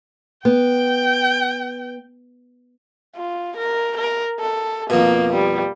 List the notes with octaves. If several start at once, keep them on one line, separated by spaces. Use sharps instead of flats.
B3 G5
F4
A#4
A#4
A4
F2 B2 A#3
G3